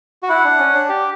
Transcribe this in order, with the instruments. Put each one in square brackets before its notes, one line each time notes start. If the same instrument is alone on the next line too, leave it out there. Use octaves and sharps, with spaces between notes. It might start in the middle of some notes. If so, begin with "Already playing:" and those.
[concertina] F#4
[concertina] E4 [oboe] F#5
[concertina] D4
C#4
D4
G4